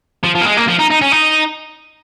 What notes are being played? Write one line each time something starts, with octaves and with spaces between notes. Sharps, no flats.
F3
F3
A#3
G#3
A#3
F3
D#4
D#4
C#4
D#4